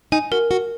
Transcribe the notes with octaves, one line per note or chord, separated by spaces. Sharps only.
D#4 G#5
F#4 A#4
F#4 A#4